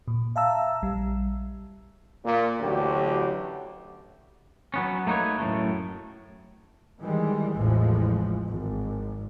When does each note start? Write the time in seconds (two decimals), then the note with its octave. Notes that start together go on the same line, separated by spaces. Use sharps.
0.08 A#2
0.36 E5 F5 A5 A#5 E6
0.82 A#1 G3
2.24 A#2
2.60 A1 D2 F#3 G4
4.74 F#3 B3 C#4
5.07 A3 A#3 D#4 B4 C#5
5.38 F#2 A2 C3 A3
7.00 D#3 E3 G3 G#3
7.54 A1 E2 A2 E3 F3 G#3
8.48 G#1